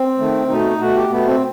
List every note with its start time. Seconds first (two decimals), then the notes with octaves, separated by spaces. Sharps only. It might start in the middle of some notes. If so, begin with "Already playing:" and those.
Already playing: C4
0.18 D#3 A3
0.48 B2 A3 D#4
0.80 B2 A3 F#4
0.95 G4
1.10 B2 A3 B3
1.26 C4